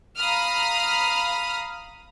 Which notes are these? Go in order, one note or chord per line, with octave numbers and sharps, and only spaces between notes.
F5 A#5 B5 D#6 F6